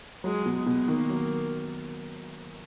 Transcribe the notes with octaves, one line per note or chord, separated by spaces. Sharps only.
F#3 G#3
B2
G#3
B2
D#3 A#3
F#3